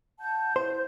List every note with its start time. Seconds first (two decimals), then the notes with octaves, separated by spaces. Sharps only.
0.19 F#5 A5 G6
0.56 E4 C5 G6